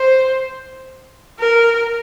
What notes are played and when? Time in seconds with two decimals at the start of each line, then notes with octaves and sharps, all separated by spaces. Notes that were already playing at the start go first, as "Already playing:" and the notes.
Already playing: C5
1.40 A#4